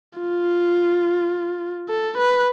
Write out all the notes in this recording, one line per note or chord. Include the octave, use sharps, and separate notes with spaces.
F4
A4
B4